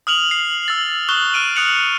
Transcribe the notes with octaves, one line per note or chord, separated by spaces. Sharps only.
D#6 F6 F7 F#7
C7
E6 A6
C#6 D#6 F#6 G7
F6 D7 D#7
D#6 F#6 C#7 F7